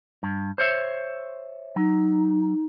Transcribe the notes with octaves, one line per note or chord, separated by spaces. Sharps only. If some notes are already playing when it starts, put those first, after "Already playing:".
G2
C5 C#5 E5
F#3 D#4